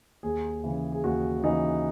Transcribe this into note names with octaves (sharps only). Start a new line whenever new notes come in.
D#2 G#4
C#3 E3
G#4
D#2 F#4
C#3 E3 D#4